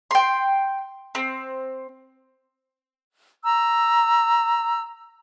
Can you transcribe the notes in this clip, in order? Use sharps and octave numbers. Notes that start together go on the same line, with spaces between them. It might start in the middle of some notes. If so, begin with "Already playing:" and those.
G5 C6
C4
A#5 E6